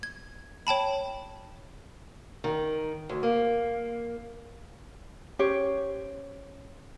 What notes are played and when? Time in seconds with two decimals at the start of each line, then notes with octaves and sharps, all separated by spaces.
0.03 G#6
0.67 C#5 G5 A5 B5
2.44 D#3
3.09 D2
3.23 A#3
5.39 C#4 G4 C5 C#5